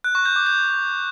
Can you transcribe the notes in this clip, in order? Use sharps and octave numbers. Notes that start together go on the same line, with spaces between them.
F#6
C#6
G6
D6
G6